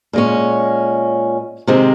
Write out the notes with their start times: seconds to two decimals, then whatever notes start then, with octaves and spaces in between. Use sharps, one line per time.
0.13 A#2 G#3 C#4
1.67 C3 D#3 G#3 C4